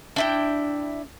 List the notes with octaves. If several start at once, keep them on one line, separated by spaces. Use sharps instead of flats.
D4 E4 G5